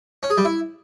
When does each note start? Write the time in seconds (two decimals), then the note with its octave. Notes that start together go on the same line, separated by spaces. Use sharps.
0.23 C#4
0.30 G#4
0.37 G3
0.45 E4